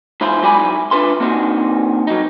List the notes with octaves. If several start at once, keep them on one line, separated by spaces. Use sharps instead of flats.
E2 G#2 E4 F4 C5
G#2 F#3 E4 D5 G#5 B5
D4 F4 B4 E5 C6
A#3 C4 D4 D#4 F#4
F#3 D#4